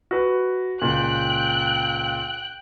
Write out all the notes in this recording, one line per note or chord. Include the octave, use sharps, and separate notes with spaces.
F#4 B4 B5
C#2 A#2 G5 F#6